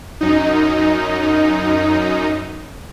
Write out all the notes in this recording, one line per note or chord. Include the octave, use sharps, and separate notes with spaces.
F#2 D#4